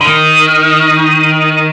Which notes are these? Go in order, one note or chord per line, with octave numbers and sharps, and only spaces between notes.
D3
D#3